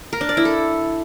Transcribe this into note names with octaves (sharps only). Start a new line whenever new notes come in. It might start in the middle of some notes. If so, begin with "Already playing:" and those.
A#4
D4
D5
E4
A4